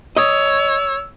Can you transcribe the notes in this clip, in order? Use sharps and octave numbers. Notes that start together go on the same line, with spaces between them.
C#5 D#5 E6